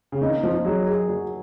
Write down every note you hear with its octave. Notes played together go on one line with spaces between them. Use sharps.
C#3
D#3 D#4
F3 D#4
F#3 G#4
G#4
F#3